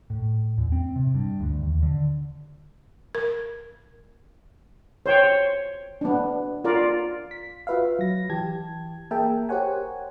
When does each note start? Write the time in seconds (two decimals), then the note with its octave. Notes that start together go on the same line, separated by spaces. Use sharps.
0.10 A2
0.58 E2
0.72 C4
0.96 C3
1.15 G2
1.40 D2
1.63 D#2
1.83 D3
3.15 A#4
5.06 C5 C#5 G5
6.01 B3 D4
6.64 F4 A#4 D5
7.31 B6
7.67 F4 F#4 B4 E5 F5
7.99 F#3 A#6
8.30 E3 G4 A5 G#6
9.11 A#3 G#4 A#4 E5 G5 A5
9.49 G4 A#4 C5 C#5 F#5 G#5